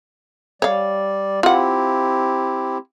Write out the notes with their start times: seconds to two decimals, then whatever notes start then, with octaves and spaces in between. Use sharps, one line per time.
0.62 G3 C#5 D5 F5
1.43 C4 E4 F4 G4 F#5